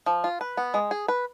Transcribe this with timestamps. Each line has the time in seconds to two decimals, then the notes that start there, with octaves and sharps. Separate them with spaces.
0.06 F3
0.24 F4
0.41 B4
0.57 B3
0.74 G#3
0.91 G#4
1.08 B4